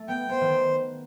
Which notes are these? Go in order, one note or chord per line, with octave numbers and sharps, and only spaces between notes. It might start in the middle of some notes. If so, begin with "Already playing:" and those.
Already playing: A3
B3 G5
B3 C5
D#3